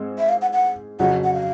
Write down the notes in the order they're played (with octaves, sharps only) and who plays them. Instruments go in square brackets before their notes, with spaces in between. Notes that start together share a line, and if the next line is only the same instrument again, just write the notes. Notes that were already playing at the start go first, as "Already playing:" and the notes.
Already playing: [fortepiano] G#2 G#3 C4
[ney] E5
F5
F#5
F#5
[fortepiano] F2 C#3 F#3 [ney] F#5
[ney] F#5
F5